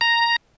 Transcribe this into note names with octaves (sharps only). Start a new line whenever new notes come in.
A#5